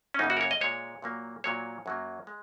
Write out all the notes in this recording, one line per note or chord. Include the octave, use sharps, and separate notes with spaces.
C#4
F#2 C#3 A#3 D#4
F#4
A#4
C#5
D#5
A#2 G#3 C#5
A#2 F#3 A#3
A#2 F#3 A#3 C#5
F#2 F#3 A#3
G#3